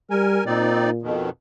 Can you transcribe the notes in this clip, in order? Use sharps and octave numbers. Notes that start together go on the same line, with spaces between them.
G3 A#4 G#5
A#2 C4 D#4 D5
F2 B2 D#3